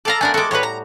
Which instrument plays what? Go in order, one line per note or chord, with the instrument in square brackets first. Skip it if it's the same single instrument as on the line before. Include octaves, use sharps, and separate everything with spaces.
[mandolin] A4 A5 A#5 [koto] D5 F5
[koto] A3 B3 A#4 [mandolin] D4 G#5
[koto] G#3 F#4 [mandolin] A4 D6
[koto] A2 G3 F#4 [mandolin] B4 C#5
[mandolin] A#5